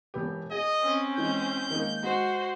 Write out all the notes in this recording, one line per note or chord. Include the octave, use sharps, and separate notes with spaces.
E1 B3 G4
G#4 D#5
C4 C#4
E3 G#3 G6
D#3 G#3 A#3
G#3 F#4 C5